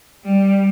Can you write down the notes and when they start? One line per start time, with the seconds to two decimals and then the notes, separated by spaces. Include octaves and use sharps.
0.25 G3